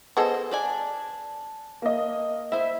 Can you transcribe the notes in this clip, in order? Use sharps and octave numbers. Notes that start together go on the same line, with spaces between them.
B3 G#4 A4 C5 D#5
D4 D5 G#5
A#3 D#5
E4 C5 E5